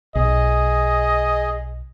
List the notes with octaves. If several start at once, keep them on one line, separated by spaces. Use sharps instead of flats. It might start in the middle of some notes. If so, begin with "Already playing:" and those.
B1 G#4 D#5